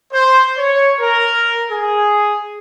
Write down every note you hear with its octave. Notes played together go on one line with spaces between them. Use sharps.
C5
C#5
A#4
G#4